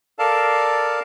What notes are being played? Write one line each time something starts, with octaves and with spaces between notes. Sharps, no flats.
A4 A#4 D5 F5 A5